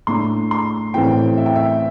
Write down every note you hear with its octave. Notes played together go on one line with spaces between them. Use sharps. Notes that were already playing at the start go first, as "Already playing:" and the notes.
A2 A3 D4 C6
C6
A1 A2 E3 C4 E4 G5
E5
G5
E5